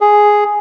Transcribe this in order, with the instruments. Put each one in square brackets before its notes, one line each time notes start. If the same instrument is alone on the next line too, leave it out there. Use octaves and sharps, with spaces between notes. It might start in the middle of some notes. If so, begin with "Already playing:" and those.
[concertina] G#4